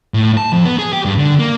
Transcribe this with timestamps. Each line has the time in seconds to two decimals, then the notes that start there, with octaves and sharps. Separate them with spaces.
0.14 A2
0.37 A5
0.53 F2
0.66 B3
0.79 G#4
0.93 G4
1.05 G2
1.18 D3
1.39 A#3